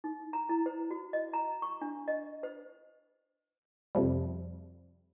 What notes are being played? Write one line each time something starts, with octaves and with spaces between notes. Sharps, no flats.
D#4
A#5
E4
C5
F#4
D#5
A#5
C#6
D4
D#5
C5
F2 C3 F3 G3